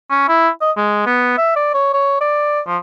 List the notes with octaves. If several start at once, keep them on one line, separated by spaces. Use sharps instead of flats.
C#4
E4
D#5
G#3
B3
E5
D5
C#5
C#5
D5
F3